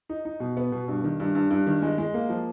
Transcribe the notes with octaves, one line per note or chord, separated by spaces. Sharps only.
D#4
D#4
B2
B3
B2
G2
D#3
G2
G2
G2
D#3
G#3
G#3
A#3
F3